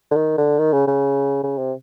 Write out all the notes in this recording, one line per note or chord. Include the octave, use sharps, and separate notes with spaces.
D3
D#3
D3
D#3
C#3
C#3
C#3
C3